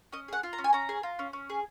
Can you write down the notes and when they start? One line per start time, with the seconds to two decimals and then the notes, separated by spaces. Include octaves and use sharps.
0.13 C#4 D#5
0.28 G#4 F#5
0.43 F4
0.53 A#5
0.58 C#4
0.64 G#5
0.73 C#4 A#5
0.89 G#4
1.03 F4
1.19 C#4
1.33 C#4
1.50 G#4